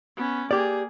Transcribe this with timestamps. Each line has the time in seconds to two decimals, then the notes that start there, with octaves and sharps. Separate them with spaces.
0.17 B3 C#4
0.51 A#3 G4 G#4 D5